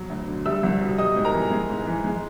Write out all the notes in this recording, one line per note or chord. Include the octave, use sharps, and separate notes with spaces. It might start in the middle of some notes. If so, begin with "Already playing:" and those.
Already playing: B2 F#3
D2
D3
G3 E5 E6
C2
B2
G3 D#5 D#6
G#2
A#4 A#5
E3
G#3
G#2
E3
G#3